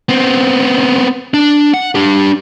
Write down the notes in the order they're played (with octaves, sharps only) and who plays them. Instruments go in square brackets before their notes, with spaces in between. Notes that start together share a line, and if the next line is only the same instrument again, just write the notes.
[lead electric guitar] B3 C4
D4
F#5
D4 G4